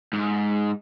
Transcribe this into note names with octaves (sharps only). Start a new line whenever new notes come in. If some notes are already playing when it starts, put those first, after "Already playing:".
G#2